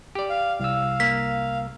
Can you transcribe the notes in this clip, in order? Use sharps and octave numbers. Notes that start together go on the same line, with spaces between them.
G4 D5
F5
C2 F5 E6
A#3 B6